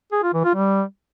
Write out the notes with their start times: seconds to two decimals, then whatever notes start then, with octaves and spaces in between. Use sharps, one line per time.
0.12 G#4
0.23 F4
0.34 E3
0.45 F4
0.55 G3